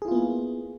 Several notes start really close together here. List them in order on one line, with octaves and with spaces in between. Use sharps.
G#4 E4 F4 B3 A#3